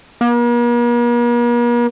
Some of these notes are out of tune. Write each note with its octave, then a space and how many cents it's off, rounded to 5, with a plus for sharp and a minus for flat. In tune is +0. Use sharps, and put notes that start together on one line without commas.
A#3 +45